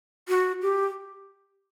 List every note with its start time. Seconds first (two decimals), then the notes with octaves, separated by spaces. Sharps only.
0.28 F#4
0.62 G4